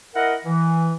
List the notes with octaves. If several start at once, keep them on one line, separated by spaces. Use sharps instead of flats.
E4 A#4 D#5 F#5
E3